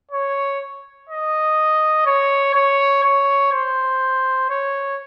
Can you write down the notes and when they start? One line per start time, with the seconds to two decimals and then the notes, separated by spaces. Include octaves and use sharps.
0.11 C#5
1.09 D#5
2.06 C#5
2.54 C#5
3.04 C#5
3.52 C5
4.50 C#5